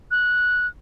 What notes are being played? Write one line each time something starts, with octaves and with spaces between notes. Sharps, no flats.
F#6